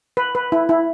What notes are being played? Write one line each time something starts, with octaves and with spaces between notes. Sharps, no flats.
B4
B4
E4
E4